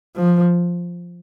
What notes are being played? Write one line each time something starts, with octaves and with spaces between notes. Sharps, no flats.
F3